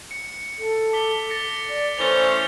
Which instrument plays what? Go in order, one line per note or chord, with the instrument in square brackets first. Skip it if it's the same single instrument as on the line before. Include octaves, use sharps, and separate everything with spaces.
[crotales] C#7
[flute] A4
[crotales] D6 B6 G7
A6 A#6 C#7
[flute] D5
[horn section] E3 A3 C#4 [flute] C5 [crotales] A6 F7 G7